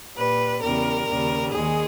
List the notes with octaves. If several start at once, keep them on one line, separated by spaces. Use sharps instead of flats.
A#2 G3 B4
E2 C#3 G3 A#4
D#2 C#3 G3
D#2 D#3 G#3 G#4